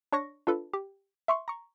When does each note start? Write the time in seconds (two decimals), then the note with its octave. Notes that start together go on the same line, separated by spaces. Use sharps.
0.12 D4 C#5 C#6 A#6
0.47 D4 F4 A4 B4
0.73 G4
1.28 E5 C6 C#6
1.48 A#5 C#6